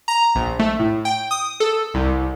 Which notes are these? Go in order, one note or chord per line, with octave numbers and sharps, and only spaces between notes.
A#5
A#1
A3
A2
G5
D#6
A4
C2